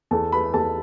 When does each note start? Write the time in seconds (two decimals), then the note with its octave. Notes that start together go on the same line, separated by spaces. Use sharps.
0.11 E2 A4 A5
0.32 B4 B5
0.53 E2 A4 A5